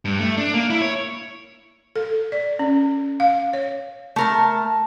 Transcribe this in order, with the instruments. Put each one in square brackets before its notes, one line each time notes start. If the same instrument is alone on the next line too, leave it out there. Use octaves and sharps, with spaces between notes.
[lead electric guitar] G2
A3
D4
A#3
E4
C#5
[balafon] A4
D5
C#4
F5
C#5
[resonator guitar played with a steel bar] A3 A#4 A5